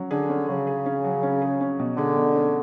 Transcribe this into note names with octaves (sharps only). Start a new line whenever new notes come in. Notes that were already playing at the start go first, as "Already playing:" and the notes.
Already playing: F#3 C#4
D3 G#4
C#4
C#3 F#3
G#4
C#4
F#3
C#4
G#4
C#4
B2
D3 G#4
B2
C#4